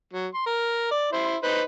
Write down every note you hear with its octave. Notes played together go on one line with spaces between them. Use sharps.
F#3
C6
A#4
D5
E4 C5 C6
D#4 B4 C5